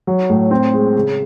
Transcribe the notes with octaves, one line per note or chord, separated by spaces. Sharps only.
F#3
A2
C4
G#3
C#3